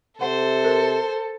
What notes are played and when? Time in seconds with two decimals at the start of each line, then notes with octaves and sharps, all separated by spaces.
0.21 C3 A4 C5 F#5
0.64 A#4